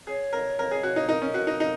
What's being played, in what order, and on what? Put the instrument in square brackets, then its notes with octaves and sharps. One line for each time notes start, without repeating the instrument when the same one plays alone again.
[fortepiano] G#4 [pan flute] C#5
[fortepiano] A#4
A#4
G#4
F#4
D#4
[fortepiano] D#4 [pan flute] A#4
[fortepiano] C#4
F#4
D#4
D#4